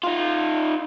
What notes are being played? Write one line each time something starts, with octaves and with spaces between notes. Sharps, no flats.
D#4 F4